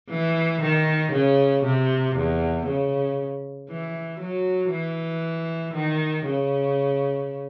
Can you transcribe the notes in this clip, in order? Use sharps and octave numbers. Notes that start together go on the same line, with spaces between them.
E3
D#3
C#3
C3
E2
C#3
E3
F#3
E3
D#3
C#3